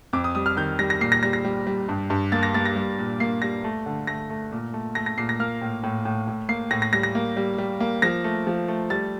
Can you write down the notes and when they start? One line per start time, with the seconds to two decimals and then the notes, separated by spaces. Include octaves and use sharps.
0.13 F2 D6
0.24 D#6
0.35 G3 D#6
0.46 F6
0.57 D#3 G6
0.79 G3 A#6
0.90 A#6
1.01 A#2 C7
1.12 A#6
1.23 G3 A#6
1.33 A#6
1.45 G3
1.67 G3
1.89 G2
2.10 G2
2.32 A#3 A6
2.43 A#6
2.54 A#3 A6
2.65 A#6
2.76 G3
2.98 A#2
3.20 A#3 C7
3.42 G3 A#6
3.64 A3
3.86 D3
4.07 A3 A#6
4.30 A3
4.52 A#2
4.73 A3
4.95 A3 A#6
5.06 A#6
5.18 A#2 C7
5.29 A#6
5.40 A#3 F6
5.61 A2
5.83 A2
6.05 A2
6.28 A2
6.49 A#3 C7
6.71 A2 A#6
6.82 A#6
6.93 G3 A#6
7.03 A#6
7.15 A#3
7.37 G3
7.58 G3
7.80 A#3
8.02 F3 A#6
8.24 A3
8.47 F3
8.68 A3
8.90 G3 A6